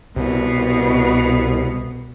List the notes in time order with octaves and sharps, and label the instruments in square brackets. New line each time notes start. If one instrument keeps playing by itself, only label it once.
[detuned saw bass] C2 [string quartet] B2